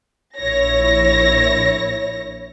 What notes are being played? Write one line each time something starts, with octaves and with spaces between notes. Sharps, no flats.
A#1 E4 C#5 A#6